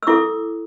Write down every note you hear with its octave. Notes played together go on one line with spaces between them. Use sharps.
E6
E4 A4 D6